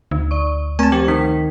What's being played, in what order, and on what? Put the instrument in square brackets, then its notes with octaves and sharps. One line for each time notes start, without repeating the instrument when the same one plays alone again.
[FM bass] D2 [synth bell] D#4
[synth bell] D5 C#6
[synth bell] A3 C4 [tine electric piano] G#5 A5
[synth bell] F3 C5 G#6 [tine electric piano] G4
[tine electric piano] D#3 [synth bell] B6